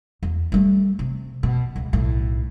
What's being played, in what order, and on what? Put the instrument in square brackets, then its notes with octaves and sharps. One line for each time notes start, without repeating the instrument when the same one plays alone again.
[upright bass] E2
G3 A3
C3
B2
C#2
B1 A2